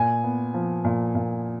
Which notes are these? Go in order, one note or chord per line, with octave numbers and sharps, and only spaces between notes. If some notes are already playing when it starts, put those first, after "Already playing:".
Already playing: A#2 G#5
B3
F3
A#2
A#2